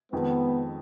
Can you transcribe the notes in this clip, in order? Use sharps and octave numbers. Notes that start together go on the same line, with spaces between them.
F2 D#3 G#3 B3